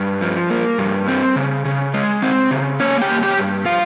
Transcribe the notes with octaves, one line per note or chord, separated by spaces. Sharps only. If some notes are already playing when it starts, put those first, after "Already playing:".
Already playing: G2
F3
A#3
G2
C4
C#3
C#3
G#3
C4
C#3
A#3 C#4 C#5
G4 G5
G2
G4 G5
G2
F3 F4 F5